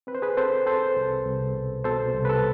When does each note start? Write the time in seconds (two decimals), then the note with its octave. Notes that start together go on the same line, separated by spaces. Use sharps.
0.07 C4 B4
0.15 C5
0.22 G#4 B4
0.37 C4 A4 C5
0.66 C4 A4 C5
0.96 C2
1.26 C2
1.55 B2
1.84 B2 A4 C5
2.15 C2
2.25 B4
2.29 A4